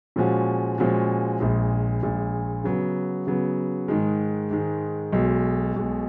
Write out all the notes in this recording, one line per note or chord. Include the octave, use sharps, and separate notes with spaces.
A#2 F3 G#3 C#4 F#4
A#2 F3 G#3 C#4 F#4
A#1 A#2 G#3
A#1 A#2 G#3
C#3 F#3 B3
C#3 F#3 B3
G#2 D#3 G#3
G#2 D#3 G#3
B1 B2 G#3
B1 B2 G#3